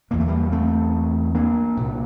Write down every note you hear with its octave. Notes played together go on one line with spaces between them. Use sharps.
E2 D3 A#3
A3
G3 A#3
A3 C4
A#3 D4
C2 A#2